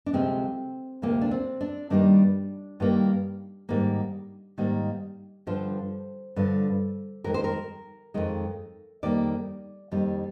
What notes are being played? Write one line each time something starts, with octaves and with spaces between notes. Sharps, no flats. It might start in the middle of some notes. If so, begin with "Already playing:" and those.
D4
D2 C3 F3 G#3 C4
D2 C3 F3 G#3 A#3
D4
C4
D4
G2 D#3 G3 A#3 D4
G2 D#3 G3 A#3
G#2 D#3 G3 A#3
G#2 D#3 G3 A#3
G2 D3 F3 C5
G2 D3 F3
F2 D#3 G#3 A#4
C5
A#4
F2 D#3 G#3
F2 D#3 G3 A#3 D5
F2 D#3 G3 A#3